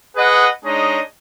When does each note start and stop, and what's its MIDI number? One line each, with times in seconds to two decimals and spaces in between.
0.17 0.48 68
0.17 0.48 71
0.17 0.48 75
0.17 0.48 78
0.65 1.01 56
0.65 1.01 62
0.65 1.01 63
0.65 1.01 68
0.65 1.01 73
0.65 1.01 75